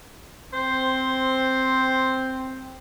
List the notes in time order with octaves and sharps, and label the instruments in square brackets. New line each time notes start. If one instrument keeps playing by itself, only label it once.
[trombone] C4 [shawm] C5